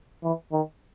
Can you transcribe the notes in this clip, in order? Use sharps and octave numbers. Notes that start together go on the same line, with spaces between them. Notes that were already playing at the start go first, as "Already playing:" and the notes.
E3
D#3